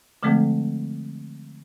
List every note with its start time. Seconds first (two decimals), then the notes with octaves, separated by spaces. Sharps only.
0.23 D3 F3 G#3 A3 C4 A4